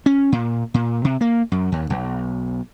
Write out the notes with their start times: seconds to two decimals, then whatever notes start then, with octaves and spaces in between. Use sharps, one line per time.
0.06 C#4
0.32 A#2
0.74 A#2
1.04 C3
1.21 A#3
1.52 F#2
1.72 D#2
1.90 B1